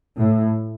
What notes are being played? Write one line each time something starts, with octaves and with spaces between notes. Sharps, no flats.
A2